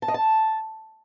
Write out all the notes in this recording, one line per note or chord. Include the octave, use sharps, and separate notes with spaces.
A5
D#5
A5